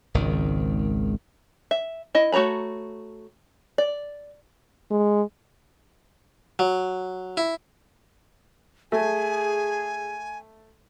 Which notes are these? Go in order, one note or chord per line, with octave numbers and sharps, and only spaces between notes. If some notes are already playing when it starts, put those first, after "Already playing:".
G#1 C#2 D#3
E5
E4 D#5
A3 F#4 C#5 A#5 B5
D5
G#3
F#3
E4
A3 G#4 E5 G#5 A5